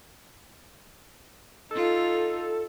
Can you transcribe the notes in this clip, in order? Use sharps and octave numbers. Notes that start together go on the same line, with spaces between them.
D#4 F4 A4